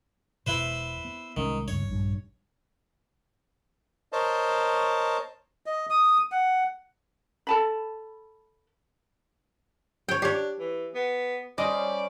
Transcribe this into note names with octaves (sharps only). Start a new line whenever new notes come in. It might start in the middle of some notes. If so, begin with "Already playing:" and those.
E1 B2 E4 B4 C5
B3
C2 D#3 G#3 C#4
C#2 G2 C#5
A#1 G2
A#4 C5 C#5 D#5 A5
D#5
D#6
F#5
A4 A5 B5
C#5 G5
D4 G4 C#5
E3
B3
G3 C#4 C5 D5 D#5